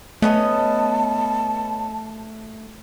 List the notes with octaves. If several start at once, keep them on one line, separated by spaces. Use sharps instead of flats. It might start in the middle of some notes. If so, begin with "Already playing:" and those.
A3 B3 C#4 D#5 A5